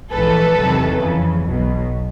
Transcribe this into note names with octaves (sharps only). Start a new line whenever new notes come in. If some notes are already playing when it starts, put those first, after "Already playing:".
A#1 G#2 E3 A4 B4
E2 C3 D#3 F#3
F2 C#3 E3
B1 B2 F#3